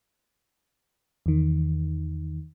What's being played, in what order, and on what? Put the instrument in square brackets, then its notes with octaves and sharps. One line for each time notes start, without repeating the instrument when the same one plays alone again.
[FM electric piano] E2 D#3